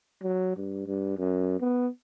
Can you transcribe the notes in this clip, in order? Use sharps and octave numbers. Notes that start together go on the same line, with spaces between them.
F#3
G2
G2
F#2
B3